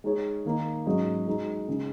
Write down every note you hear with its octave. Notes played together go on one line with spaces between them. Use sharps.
G#3 D#4 G#4 C#5
D#3 A#3 D#4
G#2 F#3 C#4 G#4 D#5
G#3 D#4 F#4
C#3 G#3 D#4